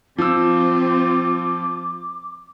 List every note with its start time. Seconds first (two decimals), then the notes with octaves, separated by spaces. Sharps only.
0.18 F3 C4 F4 D6 E6